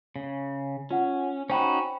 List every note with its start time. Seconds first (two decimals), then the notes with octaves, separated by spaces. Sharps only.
0.16 C#3
0.91 C#4 F4 F#5
1.50 C#4 D#4 F#4 C5 G5 B5